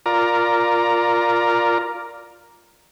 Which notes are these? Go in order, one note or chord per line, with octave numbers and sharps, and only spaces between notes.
F4 A#4 D5 A#5